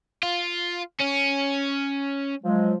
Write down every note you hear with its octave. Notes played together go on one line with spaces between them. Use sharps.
F4
C#4
F3 F#3 G#3